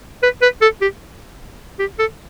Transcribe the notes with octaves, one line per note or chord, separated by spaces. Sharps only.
B4
B4
A4
G4
G4
A4